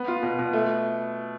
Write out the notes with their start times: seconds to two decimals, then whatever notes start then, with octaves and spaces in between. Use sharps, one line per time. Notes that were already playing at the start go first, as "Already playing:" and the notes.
Already playing: B3
0.08 F4
0.23 B2
0.39 B2
0.53 A3